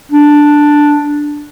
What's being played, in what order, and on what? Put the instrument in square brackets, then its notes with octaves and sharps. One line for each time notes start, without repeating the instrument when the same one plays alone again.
[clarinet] D4